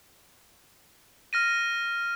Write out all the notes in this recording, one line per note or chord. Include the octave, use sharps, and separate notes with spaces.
F6 A#6 D#7